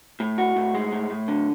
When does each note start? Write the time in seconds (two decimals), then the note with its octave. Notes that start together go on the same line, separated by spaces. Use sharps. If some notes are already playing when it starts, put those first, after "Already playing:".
0.20 A2
0.38 F#4
0.56 A2
0.75 G#3
0.92 A2
1.10 A2
1.28 D3